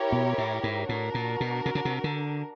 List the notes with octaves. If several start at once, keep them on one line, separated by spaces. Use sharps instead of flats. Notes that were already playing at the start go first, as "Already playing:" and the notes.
Already playing: E4 G4 A#4 C#5
B2
A2
G#2
A2 D4 F#4 A#4
A#2
B2
C3
C#3
C3
D3